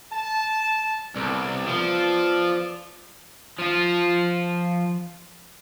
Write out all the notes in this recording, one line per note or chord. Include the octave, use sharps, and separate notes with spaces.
A5
C2 B3 A4 D5
F3
F3 F4